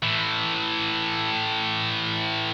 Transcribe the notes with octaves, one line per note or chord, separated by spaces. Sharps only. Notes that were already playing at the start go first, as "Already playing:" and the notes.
A2 E3